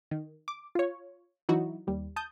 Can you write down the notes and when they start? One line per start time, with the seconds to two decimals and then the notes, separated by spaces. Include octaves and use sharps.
0.11 D#3
0.48 D6
0.75 F4 C#5
1.49 E3 F#3 D#4 E4 F#4
1.87 D#2 G3
2.16 A5 D#6 G6